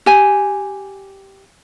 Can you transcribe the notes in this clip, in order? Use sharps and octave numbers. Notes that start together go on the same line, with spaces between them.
G4 G#5